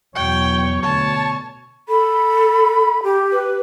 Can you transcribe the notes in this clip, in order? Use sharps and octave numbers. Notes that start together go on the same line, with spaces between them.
E2 B2 F#3 C#5 G5
D2 B2 C#5 A5
A4 B5
G4
B4